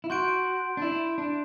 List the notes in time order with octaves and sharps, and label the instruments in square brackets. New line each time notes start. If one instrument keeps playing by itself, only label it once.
[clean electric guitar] E4
[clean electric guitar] F#4 [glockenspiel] C6 G6 D7
[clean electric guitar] D4
E4
D4